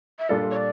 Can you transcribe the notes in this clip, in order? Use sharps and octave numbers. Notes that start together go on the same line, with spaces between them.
E5
A#2 G3 D4 F4 A4 D5
C#5
D5